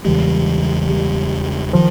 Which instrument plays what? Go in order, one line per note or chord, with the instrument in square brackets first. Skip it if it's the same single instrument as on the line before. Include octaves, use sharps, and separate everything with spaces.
[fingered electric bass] E2 C#3 E3 G#3 [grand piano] G3
[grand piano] G3
[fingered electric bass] D#3 [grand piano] F3